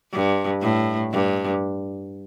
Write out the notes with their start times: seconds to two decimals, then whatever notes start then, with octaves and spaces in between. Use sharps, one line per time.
0.12 G2
0.62 A2
1.12 G2